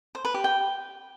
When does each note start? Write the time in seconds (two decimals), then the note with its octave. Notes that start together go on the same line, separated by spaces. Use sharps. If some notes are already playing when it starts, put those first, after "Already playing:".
0.15 C5
0.25 B4
0.34 G4
0.44 G5